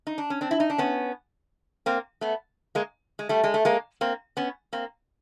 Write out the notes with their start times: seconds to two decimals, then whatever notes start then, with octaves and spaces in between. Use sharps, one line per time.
0.07 D#4
0.18 D4
0.30 C#4
0.41 C4 D4
0.51 E4
0.60 D#4
0.70 D4
0.78 B3 C#4
1.86 A#3 C4
2.21 A3 B3
2.75 G#3 A#3
3.19 G#3
3.29 G3 A3
3.44 G#3
3.54 A3
3.65 G#3 A#3
4.01 A#3 C4
4.37 B3 C#4
4.73 A#3 C4